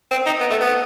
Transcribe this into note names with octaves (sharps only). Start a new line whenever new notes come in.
C4
D#4
B3
A3
B3